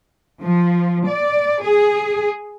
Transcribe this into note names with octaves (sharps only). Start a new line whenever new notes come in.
F3
D5
G#4